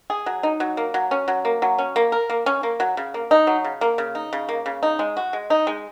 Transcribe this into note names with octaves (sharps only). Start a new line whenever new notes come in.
G#4
F#3
D#4
F#3
A#3
F#3
C#4
F#3
A#3
F#3
C#4
A#3
A#4
A#3
C#4
A#3
F#3
C#3
A#3
D#4
F#3
C#3
A#3
C#3
D#4
C#3
A#3
C#3
D#4
G#3
F#4
G#3
D#4
G#3